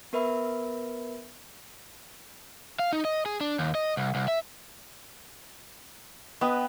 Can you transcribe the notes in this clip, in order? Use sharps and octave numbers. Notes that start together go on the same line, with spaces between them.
B3 A#4 B4 E5 B5
F5
D#4
D#5
G#4
D4
D#2
D#5
C2
C2
E5
B3 B4 D#5 G5